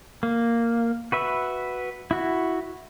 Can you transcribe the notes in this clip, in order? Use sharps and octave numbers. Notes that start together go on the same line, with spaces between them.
A#3
F#4 B4 E5
E4 F#4